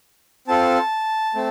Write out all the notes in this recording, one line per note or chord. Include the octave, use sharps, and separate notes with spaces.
C4 F4 A4 A5
A3 C4